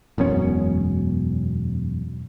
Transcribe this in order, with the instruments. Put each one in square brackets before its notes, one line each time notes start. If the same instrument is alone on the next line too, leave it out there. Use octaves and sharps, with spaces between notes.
[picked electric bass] E1 F#2 B2 C#4